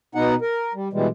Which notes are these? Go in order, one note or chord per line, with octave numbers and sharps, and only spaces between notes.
B2 B3 D#4 F#5
A#4
G3
B2 E3 G3 G#3